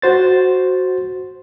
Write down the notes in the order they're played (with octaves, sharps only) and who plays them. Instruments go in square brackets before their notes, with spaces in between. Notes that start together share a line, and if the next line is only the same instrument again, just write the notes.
[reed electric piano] F#4 C5 A6